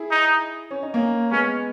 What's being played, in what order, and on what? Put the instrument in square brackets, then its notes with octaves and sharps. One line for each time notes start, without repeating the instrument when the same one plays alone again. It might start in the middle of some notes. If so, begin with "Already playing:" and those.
Already playing: [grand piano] E4 G#4
[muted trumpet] D#4
[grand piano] C#4
D#4
A#3 C#4
[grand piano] G#3 B3 [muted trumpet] C#4